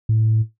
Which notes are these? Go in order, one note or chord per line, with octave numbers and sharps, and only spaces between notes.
A2